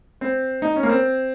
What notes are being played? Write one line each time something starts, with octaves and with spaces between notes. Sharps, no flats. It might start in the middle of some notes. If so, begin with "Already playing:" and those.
C4
D#4
C#4
A#3
C4